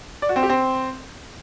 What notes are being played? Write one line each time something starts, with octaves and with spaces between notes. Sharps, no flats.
D5
F#4
C4
G4
C4